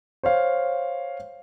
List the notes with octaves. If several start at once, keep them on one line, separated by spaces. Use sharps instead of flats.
C5 C#5 F5